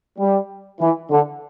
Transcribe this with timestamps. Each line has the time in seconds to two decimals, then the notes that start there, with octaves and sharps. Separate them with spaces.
0.19 G3
0.81 E3
1.10 D3